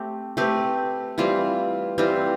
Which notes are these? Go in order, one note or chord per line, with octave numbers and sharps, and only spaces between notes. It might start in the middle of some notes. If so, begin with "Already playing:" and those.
Already playing: A3 C4 G4
A3 C4 G4 B4
E3 G3 C4 F4
E3 G3 C4 F4